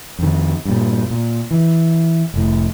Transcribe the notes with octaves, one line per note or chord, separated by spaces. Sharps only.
F2 D#3
G2 A#2
A#2
E3
F1 A2